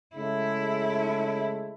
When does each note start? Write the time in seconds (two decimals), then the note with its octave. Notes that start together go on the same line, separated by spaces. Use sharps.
0.16 C#3 G#3 A3 E4